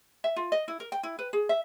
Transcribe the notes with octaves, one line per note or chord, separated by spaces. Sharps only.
E5
F4
D#5
E4
A#4
G5
E4
B4
G#4
E5